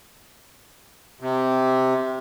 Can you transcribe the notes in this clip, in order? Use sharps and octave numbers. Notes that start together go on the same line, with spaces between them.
C3